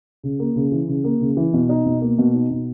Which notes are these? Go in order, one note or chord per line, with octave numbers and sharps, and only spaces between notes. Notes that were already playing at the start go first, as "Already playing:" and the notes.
C#3
A#3
C#3
E3
C#3
A#3
C#3
E3
B2
D#4
B2
A#3
B2
D#4
B2